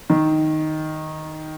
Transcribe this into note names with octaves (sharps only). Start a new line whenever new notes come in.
D#3